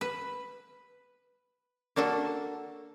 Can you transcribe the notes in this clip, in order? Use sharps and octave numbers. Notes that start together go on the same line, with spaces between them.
B4
A#3 D4 F#4 A4